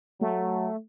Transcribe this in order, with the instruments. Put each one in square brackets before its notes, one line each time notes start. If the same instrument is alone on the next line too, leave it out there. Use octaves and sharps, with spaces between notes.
[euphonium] F#3 [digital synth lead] A3